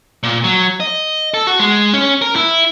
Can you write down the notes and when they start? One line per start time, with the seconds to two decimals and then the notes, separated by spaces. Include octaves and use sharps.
0.23 A#2
0.44 F#3
0.80 D#5
1.34 A4
1.47 F#4
1.60 G#3
1.94 C#4
2.22 A#4
2.36 E4